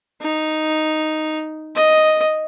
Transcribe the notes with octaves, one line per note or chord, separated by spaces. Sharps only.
D#4
D#5